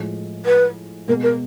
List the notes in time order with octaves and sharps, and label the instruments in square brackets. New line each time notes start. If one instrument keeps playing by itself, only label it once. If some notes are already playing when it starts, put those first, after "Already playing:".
Already playing: [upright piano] A2 F3 G#3
[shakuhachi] B4
[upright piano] B2 G#3 B3 [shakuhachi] A#4
[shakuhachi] A#4